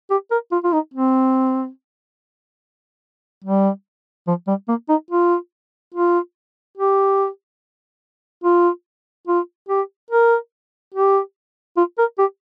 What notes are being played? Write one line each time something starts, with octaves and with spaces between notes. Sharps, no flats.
G4
A#4
F4
F4
D#4
C4
G3
F3
G3
A#3
D#4
F4
F4
G4
F4
F4
G4
A#4
G4
F4
A#4
G4